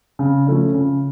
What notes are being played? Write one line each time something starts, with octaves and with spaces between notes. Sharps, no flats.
C#3
F3 A3 C#4
C#3